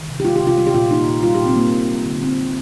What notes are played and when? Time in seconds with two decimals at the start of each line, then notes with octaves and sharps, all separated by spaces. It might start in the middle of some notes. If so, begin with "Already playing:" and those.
Already playing: D#3
0.09 C3
0.20 G4
0.25 G#3 F4
0.36 G4
0.42 C3
0.47 F4
0.57 G3 F4
0.67 G4
0.74 A#2 F4
0.91 A#3 D#4
1.07 A#2
1.23 G3 F4
1.35 G4
1.40 A#2
1.46 C4
1.56 A#3
1.72 A#2
1.90 G3
2.05 D3
2.22 A#3 C4
2.39 D3